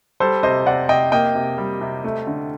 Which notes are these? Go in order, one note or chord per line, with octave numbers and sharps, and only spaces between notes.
G3 A4 C5
C3 C5 D#5
C3 D5 F#5
C3 D#5 G5
A#3 D#5 G5
C3
G3
C3
A3
D3